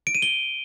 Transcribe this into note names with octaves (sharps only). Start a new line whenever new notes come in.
D7
D#7
G7